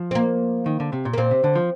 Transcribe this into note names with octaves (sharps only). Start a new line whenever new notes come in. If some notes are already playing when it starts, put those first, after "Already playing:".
Already playing: F3
C4
A#3
D#3
D3
C3
A#2
A#3
A#2 C4
C3
D3
F3